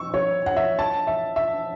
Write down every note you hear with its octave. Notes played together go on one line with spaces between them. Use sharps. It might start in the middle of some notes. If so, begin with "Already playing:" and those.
Already playing: C#6 E6
C#5
F#5
E5
A5
E5
E5